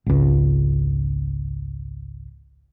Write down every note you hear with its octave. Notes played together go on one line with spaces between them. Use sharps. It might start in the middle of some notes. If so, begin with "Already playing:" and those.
G#1 C#2